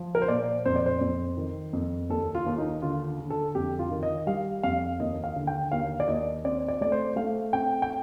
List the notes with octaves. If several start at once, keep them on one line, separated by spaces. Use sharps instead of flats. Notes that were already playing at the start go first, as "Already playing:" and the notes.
Already playing: F3
A#4
C5
A#2 D5
F2 C5
D5
C5
F2
D#3
F2
D#2 A4
F4
D#2
D#4
D3 F4
D3
A4
F2 G4
F4
D#3
D#5
G3 F5
F2 F5
D#2 D#5
F5
D3
G5
D#2 F5
D5
D#2 D#5
C4 D5
D5
A3 D5
C5
A3 F5
C4 G5
G5